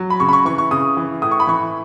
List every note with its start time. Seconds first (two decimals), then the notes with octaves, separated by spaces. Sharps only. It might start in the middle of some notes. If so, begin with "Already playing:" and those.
Already playing: F#3
0.10 B5
0.20 C#3 C#6
0.29 B5
0.33 C#6
0.45 E3 C#6
0.58 C#6
0.71 C#3 D#6
0.97 E3
1.22 A2 D#6
1.31 C#6
1.40 B5
1.47 E3 C#6